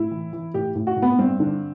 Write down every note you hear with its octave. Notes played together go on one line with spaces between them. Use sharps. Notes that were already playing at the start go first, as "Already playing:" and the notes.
Already playing: A2 E4
E3
E3
A2 G4
A2
F#4
A2
B3
G2 C4
D3